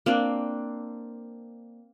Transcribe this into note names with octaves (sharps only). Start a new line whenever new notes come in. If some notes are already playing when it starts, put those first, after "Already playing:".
A#3 C4 D4